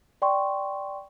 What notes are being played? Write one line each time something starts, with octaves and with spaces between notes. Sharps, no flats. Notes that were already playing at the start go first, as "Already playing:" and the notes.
D5 G5 C6 C#6